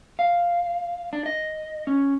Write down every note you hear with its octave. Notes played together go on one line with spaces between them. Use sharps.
F5
D4
D#5
C#4